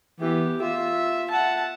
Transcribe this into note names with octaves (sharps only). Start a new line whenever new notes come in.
E3 B3 G4
F4 E5
F#5 A5